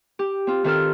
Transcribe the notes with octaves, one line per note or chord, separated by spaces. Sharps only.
G4
C4 F4
D#3 C4 A4 F6